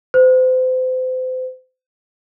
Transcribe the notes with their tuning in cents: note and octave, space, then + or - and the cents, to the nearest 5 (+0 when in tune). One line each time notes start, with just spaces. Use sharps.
C5 -35